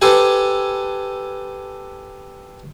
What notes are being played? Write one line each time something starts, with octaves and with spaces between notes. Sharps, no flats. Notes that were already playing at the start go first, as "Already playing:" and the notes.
G4 A4 B4 C5 G#5